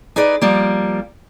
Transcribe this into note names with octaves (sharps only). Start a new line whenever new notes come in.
D#4 G#4 B4 D5
F3 G3 A#3